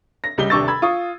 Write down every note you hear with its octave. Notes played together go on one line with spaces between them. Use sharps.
A#6
C#2 G3 G7
D#1 C3 D4 C#6 E6 A6
B5 E6 G#6
F4 C#6 D#6